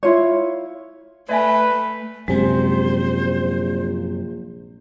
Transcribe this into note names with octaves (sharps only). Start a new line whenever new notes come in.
E4 F4 C#5
A3 B4 D5 E5 G#5
A#1 F#2 C3 G#3 C5